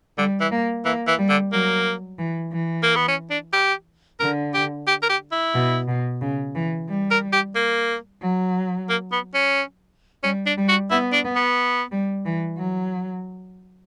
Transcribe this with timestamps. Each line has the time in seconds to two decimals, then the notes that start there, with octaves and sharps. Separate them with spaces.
0.18 D3 G3
0.40 E3
0.51 A#3
0.85 E3 A#3
1.07 E3
1.18 G3
1.29 D3
1.52 F#3 A#3
2.18 E3
2.52 E3
2.83 A#3
2.96 B3
3.08 C#4
3.31 D4
3.53 G4
4.20 D3 A#4
4.54 G4
4.87 G4
5.03 A#4
5.10 G4
5.32 E4
5.55 B2
5.88 B2
6.21 C#3
6.55 E3
6.89 G3
7.11 A#4
7.33 G4
7.55 A#3
8.22 F#3
8.90 A#3
9.12 B3
9.35 C#4
10.24 G3 C#4
10.46 D4
10.57 G3
10.69 F#4
10.91 B3 E4
11.13 D4
11.25 B3
11.35 B3
11.92 G3
12.25 E3
12.58 F#3